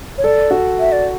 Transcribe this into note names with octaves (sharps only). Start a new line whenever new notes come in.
C#5
A4 D5
F#4
E5
D5